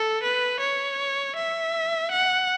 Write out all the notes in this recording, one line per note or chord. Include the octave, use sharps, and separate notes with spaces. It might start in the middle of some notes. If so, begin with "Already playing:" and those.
Already playing: A4
B4
C#5
E5
F#5